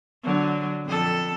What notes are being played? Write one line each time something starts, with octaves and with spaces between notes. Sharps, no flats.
D3 F#3
F2 A4